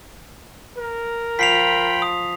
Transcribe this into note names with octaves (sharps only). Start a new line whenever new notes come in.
A#4
F3 G5 B5 B6 C7 F7
D#6